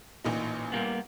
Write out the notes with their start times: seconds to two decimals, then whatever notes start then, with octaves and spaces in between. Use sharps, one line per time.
0.24 A1 A#2 D#4
0.72 G3 A#3 B3